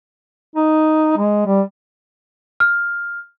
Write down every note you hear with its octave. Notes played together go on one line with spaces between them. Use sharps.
D#4
G#3
G3
F6